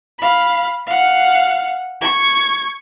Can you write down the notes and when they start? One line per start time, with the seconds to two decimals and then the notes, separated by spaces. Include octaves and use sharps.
0.19 F5 B5
0.87 F5 F#5
2.01 C#6 G#6